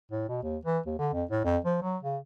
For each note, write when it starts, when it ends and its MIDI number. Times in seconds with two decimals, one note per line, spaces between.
0.12 0.24 45
0.29 0.41 47
0.43 0.57 39
0.65 0.79 52
0.86 0.97 39
0.99 1.13 50
1.13 1.24 41
1.31 1.42 45
1.45 1.58 41
1.65 1.78 53
1.82 1.97 54
2.03 2.18 49